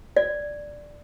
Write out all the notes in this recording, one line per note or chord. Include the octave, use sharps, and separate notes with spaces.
D5